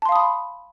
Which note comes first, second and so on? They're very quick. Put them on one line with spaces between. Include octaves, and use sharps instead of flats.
A5 C6 F5 D#6 B5